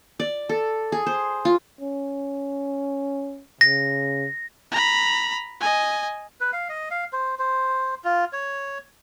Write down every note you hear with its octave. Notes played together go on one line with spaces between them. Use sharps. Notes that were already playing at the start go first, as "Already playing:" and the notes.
D5
A4
G#4
C5
F4
C#4
C#3 A#6
A#5 B5
D#5 G#5
B4
F5
D#5
F5
C5
C5
F4
C#5